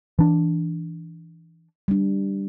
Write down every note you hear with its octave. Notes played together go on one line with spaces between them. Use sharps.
E3 D4
G3 D4